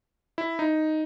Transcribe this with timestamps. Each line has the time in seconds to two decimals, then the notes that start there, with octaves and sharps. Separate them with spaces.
0.38 E4
0.59 D#4